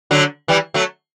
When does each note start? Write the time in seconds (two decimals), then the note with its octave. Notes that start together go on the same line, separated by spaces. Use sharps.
0.11 D3 F#3
0.48 E3 G3
0.74 F#3 A3